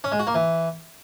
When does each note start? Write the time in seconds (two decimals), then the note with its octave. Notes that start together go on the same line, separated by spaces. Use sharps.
0.04 C#4
0.12 G#3
0.19 F#4
0.27 A#3
0.35 E3